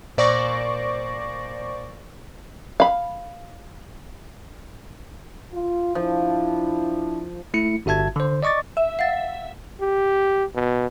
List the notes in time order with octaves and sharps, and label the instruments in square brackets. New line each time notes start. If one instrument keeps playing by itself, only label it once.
[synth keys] A#2 C5 D5 C#6 D6 A#6
[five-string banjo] F5 B5
[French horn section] F4
[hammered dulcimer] F3 [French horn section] D4 E4
[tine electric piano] A3 E4 C#7
G1 F#4 E5 A5 G#6
D3 C5
D5 D#5 C#6 D6 A6
[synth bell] E5
[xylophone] F5 F#5 A6
[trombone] G4
B2